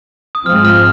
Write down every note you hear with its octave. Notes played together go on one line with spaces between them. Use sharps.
D#6
G#2 F3 G#3 C4 F6
F6